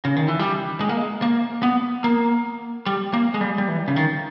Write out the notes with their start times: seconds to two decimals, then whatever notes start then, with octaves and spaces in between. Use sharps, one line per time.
0.05 C#3
0.16 D#3
0.28 E3
0.39 G3
0.81 G#3
0.89 A#3
0.97 G#3
1.22 A#3
1.63 B3
2.04 A#3
2.86 G3
3.14 A#3
3.34 G#3
3.41 G3
3.58 G3
3.68 E3
3.88 C#3
3.96 D#3